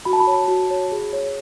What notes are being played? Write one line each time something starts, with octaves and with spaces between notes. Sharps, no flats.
F#4 B5
A5
B5
C#5
F#4
C#5
G#4
C#5